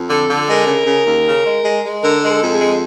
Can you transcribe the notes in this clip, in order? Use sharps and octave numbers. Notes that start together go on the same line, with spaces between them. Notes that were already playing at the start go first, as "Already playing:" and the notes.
Already playing: F2
D3 A4
D3
G#3 A#4
C#3
C#3
D#2
C#3
G#3
G#3
G#3
D3 A#4
G#3 A#4
A4
F2
G#4
G#3